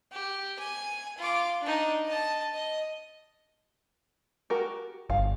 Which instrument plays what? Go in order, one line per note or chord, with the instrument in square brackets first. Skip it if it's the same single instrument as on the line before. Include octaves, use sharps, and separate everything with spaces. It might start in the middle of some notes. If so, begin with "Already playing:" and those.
[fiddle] G4
G#5
F4 D6
D4 D#4
D#5 A5
D#5
[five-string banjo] F#4 G4 A#4
[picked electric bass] G1 [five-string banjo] F5